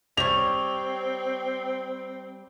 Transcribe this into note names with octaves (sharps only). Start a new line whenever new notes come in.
G3 C4 C#5 F7